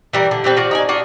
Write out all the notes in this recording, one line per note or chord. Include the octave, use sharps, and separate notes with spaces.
E3 G3 A#4
D3
E3 G3 C4 B4
F4 F#4 D5
D#4 D5 G#5
D4 F4 F#4